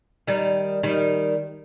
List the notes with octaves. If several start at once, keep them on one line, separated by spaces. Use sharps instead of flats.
D#3 G3
D#3 G3